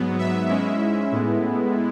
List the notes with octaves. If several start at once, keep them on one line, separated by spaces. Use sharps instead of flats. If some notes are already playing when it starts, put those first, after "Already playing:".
Already playing: G#2 F#3 B3
E5
G#2 G#3 C#4 E4
A2 G#3 B3 E4